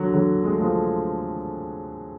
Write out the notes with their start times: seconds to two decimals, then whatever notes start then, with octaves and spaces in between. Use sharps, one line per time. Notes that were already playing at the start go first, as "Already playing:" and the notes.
Already playing: D3 F#3
0.13 D3 F#3
0.44 G#3
0.52 A3
0.60 F3 G#3